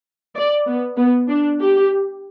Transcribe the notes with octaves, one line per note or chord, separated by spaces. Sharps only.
D5
B3
B3
D4
G4